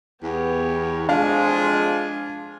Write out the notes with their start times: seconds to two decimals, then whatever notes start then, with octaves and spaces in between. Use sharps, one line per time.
0.23 E2 B3 G4 C#5
1.09 F2 F3 G#3 D4 F4 F5 G#5